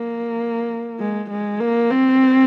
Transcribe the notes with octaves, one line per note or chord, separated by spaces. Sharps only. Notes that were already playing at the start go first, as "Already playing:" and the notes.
Already playing: A#3
G#3
G#3
A#3
C4